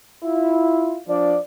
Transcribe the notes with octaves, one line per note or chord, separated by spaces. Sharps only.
E4 F4
F3 D4 D5